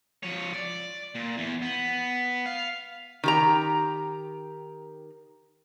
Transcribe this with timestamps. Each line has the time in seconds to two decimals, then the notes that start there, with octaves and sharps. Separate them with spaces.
0.23 F3 C#5
0.53 D5
1.15 A#2
1.37 E2
1.62 B3
2.46 F5
3.24 D#3 G4 A#5